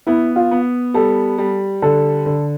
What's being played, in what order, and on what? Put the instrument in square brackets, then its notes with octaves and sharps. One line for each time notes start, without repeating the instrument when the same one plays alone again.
[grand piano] B3 [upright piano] E4
[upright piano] F4
[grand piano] B3
[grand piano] G3 [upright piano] A4
[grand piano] G3
[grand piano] D3 [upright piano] A4
[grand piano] D3